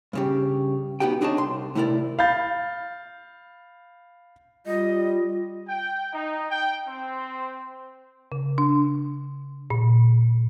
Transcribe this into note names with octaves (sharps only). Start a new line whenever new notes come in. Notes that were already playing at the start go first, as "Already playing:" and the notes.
G2 C#3 G4
B3 D#4 F#4 G4 G5
C4 D4 D#4 G#4 C#5 A5
C2 C6
A2 C3 E4 A#4 D5
F5 B5 G6 A6
G3 F4 D#5
G5
D#4
G5
C4
C#3
D4
A#2